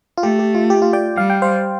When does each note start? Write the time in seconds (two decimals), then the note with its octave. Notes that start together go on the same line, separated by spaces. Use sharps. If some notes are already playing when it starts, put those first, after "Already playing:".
0.17 F4
0.23 A3 G4
0.39 G4
0.55 F4
0.70 G4
0.82 F4
0.93 D5 G5
1.17 G3 F5
1.30 G5
1.42 C5 F5